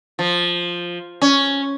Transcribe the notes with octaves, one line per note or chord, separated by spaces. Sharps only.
F3
C#4